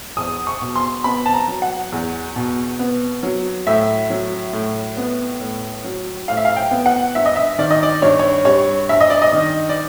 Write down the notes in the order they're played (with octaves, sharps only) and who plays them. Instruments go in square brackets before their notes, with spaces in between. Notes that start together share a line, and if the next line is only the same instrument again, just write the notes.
[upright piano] E2 D#6
C#6
B2
C6
B3 B5
A5
A#5
F#3
F#5
E2
B2
B3
F#3
A2 E5
F#3
A2
B3
A2
F#3
A2 F5
E5
F5
G5
B3
F#5
G2 E5
D#5
E5
D#3 D5
D#5
D5
G2 C#5
C#5
G3 C#5
G2 E5
D#5
D5
D#5
D#3
D5